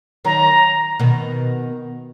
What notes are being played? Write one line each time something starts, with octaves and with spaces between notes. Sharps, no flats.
D#3 F#3 A#5
B2 D#3